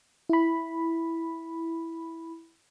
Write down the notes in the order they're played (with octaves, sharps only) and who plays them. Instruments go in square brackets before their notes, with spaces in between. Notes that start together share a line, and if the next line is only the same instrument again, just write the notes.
[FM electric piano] E4 B5